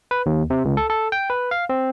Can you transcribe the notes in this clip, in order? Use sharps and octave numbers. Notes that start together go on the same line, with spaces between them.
B4
D#2
C3
C#2
A4
A4
G5
B4
F5
C4